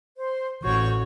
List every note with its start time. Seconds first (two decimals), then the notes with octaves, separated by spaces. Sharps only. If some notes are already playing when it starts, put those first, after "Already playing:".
0.17 C5
0.64 A1 F#4 C#5 C#6 G6